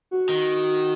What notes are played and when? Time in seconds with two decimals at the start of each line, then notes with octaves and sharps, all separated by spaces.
0.11 F#4
0.29 D#3